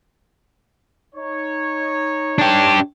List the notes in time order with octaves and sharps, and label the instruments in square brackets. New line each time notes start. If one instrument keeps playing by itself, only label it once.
[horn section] D#4 C#5
[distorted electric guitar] D4 G4